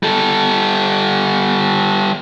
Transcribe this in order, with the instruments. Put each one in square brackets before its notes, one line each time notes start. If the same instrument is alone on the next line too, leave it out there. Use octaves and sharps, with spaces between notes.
[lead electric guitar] G3 A4